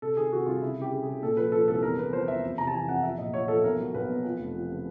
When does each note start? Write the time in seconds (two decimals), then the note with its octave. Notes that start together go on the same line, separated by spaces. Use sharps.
0.02 C3 A4
0.17 D#3 G#4
0.31 C3 F#4
0.46 C2 F4
0.62 C#3 E4
0.77 C#3 G4
0.92 C#3
1.03 C#3 G#4
1.22 A#2 A4
1.37 F3 B4
1.52 F3 A4
1.68 C2 A4
1.83 E2 A#4
1.98 E2 B4
2.13 F3 C5
2.28 E2 E5
2.43 F2
2.58 C3 A#5
2.67 A5
2.74 E3 G#5
2.89 F2 F#5
3.03 F3 E5
3.18 A#1 D#5
3.34 A#2 C#5
3.48 F3 A4
3.64 B1 A#4
3.79 F#3
3.94 B1 B4
4.10 B2
4.25 F3
4.39 F1
4.55 F3
4.70 C#3